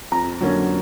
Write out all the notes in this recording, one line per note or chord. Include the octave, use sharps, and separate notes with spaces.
F2 A#5
D3 F#3 A#3 C#4